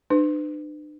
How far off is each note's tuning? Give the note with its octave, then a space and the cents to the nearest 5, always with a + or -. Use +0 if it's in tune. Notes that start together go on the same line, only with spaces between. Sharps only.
D4 +40 B4 +35